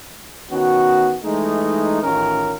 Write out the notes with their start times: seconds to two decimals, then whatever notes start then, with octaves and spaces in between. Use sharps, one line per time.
0.51 D#3 B3 C#4 F#4
1.24 E3 G#3 A3 D#4
2.03 A1 D#3 C#4 F4 A#4